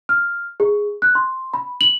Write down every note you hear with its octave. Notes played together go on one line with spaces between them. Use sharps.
F6
G#4
F#6
C6
B5
F#7